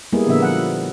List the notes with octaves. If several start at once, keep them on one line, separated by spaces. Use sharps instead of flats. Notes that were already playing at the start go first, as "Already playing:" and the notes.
G3 G#3 A#3 B3 E4 G#4
A#2 D3 F3 A#3 B3 E5
F3 F#5